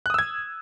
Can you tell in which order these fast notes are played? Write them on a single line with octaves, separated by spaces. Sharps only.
F#6 D#6 E6 G#6